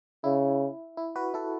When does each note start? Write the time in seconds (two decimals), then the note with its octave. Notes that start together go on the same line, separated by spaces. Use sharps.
0.24 C#3 E4
0.97 E4
1.16 F#4 B4
1.34 E4 A4